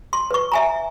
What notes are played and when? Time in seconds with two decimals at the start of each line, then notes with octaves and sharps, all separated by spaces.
0.13 C6
0.31 B4 C#6
0.52 E5 G#5 A#5